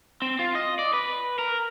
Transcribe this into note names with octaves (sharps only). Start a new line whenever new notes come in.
C4
F4
D#5
D5
B4
A#4